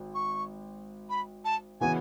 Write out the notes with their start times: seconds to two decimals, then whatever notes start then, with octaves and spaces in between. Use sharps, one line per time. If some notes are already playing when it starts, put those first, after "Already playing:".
Already playing: G#1
0.14 C#6
1.10 B5
1.45 A5
1.81 C#3 E3 B3 F#4 G#5